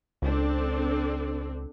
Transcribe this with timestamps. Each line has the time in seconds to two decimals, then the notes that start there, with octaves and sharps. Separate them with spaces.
0.22 C#2 C4 D4 A4